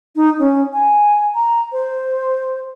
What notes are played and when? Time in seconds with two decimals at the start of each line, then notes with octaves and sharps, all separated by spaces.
0.16 D#4
0.39 C#4
0.73 G#5
1.35 A#5
1.72 C5